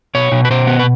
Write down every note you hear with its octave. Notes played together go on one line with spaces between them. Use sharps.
B2 C#5
B2
B4
B2 C5
B3
B4